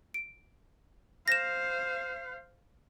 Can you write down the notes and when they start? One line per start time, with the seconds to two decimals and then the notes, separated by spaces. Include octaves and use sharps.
0.14 D7
1.28 C5 F5 A#6 E7